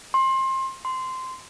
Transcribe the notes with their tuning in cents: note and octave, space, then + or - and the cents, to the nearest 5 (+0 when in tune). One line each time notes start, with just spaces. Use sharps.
C6 +25
C6 -15